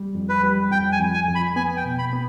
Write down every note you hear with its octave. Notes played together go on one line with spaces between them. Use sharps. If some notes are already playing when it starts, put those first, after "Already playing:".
Already playing: G3
F2
B4
G3
F2 G5
G#5
F2
G#5
F2
B5
B3 G#5
G5
B2
B5
B3